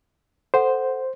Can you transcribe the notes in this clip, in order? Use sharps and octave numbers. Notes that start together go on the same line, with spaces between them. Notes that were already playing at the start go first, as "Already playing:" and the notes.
A4 C5 F#5